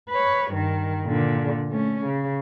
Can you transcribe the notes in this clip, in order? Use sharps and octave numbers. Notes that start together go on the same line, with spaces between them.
B4 C#5
G2 D#3
A#2 D3
A3 C#4
C#3